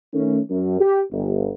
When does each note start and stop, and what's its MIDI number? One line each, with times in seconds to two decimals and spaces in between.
0.13 0.39 51
0.13 0.39 57
0.13 0.39 61
0.50 0.80 42
0.80 1.00 67
1.12 1.51 31